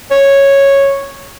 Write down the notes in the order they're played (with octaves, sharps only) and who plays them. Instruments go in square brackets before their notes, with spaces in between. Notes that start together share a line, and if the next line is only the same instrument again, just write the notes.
[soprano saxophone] C#5